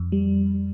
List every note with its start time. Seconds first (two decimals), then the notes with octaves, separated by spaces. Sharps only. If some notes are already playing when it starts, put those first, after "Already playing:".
Already playing: F2
0.12 G3